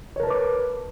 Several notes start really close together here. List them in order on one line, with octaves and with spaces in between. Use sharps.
C#5 A#4 A5 B4 D6